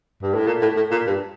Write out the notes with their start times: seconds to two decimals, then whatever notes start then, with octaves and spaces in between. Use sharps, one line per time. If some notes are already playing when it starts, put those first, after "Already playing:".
0.23 G2
0.34 A2
0.47 A#2
0.62 A2
0.77 A2
0.91 A#2
1.07 G2